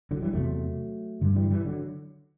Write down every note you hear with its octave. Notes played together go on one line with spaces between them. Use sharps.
D3 F#3
E3 G3
E2 C3 F#3 A3
G2 D3
E3 G3
E3 G3
D3 F#3